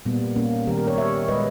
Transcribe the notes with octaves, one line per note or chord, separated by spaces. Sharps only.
A#2 G3 A#3 B3
A#3 C#4
D#3 G3 A#3 G4 A#4
G4 A#4
A#4 C#5
C#5 E5
A#2 G#3 B4 D#5